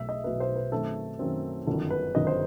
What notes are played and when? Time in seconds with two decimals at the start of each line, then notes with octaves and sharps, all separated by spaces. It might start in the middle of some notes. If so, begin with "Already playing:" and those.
Already playing: B1 B2 A3 E5
0.09 D#5
0.24 B1 B2 A3 B4
0.40 C5
0.56 B4
0.72 F#2 D#3 A3 C4 A4
1.19 F#2 D#3 A3 C4
1.67 G1 F#2 D#3 A4
1.90 B4
2.15 G1 F#2 D#3 D#5
2.27 C5